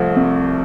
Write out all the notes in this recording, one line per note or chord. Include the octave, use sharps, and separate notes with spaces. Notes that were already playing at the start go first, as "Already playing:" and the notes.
Already playing: C2 F3 A3
C3